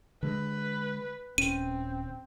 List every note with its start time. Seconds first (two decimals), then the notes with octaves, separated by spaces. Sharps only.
0.23 D3 G#3 B4
1.38 D#1 C4 C#4 D#7